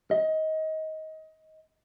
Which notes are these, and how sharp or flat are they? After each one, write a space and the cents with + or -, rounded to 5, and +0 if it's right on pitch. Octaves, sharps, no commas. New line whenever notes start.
D#5 +20